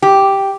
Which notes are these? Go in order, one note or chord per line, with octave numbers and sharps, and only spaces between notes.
G4